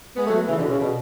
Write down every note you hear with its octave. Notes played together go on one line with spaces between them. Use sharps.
G#3 B3
F#3 A3
C#3 E3
B2 D3
C#3
B2